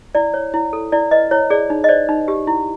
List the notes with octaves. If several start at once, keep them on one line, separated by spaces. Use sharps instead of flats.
E4 D5
C#5
E4
A4
E4 D5
B4 D#5
E4 C#5
G#4 D5
D#4
D#5
C5 D5
D#4
G4
E4